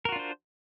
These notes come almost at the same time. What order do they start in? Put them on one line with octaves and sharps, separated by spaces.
A#4 F#4 F4 D4 C5